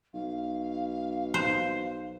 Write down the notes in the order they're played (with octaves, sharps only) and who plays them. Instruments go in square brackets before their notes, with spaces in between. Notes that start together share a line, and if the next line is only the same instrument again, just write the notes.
[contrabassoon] B1 [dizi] F5
[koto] C5